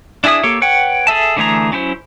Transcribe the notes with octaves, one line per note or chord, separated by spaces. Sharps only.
D4 E4 G#4 E5 D#6
A#3 G4 A4 C#5
B4 C#5 F#5 G5
G#4 A4 E5 A5
D3 E3 A3 G#4 A#5
F#3 C#4 E4 C5